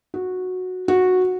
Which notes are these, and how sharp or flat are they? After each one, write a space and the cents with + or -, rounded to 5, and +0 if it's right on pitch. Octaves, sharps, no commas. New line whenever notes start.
F#4 -10
F#4 -10